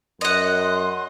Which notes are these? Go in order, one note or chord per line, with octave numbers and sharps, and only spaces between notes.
F#2 D#5 F#5 C6